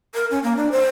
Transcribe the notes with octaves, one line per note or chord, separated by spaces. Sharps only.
A#4
C#4
A#3
D4
C5